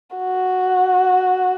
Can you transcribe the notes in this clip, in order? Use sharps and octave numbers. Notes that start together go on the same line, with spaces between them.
F#4